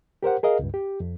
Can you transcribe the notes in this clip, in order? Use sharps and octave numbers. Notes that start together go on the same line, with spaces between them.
G4 A#4 C5 F#5
G#4 A#4 D#5 F5
C#2 G2
G4
F2